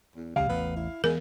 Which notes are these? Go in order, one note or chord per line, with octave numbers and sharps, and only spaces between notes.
E2
C#2 C#3 G3 F5
A1 E2 B3
E4
E3 G#3 B3 A#4